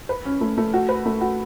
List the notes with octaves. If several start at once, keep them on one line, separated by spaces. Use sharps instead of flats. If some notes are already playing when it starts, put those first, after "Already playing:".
B4
C#4
A3
A3
F#4
B4
A3
F#4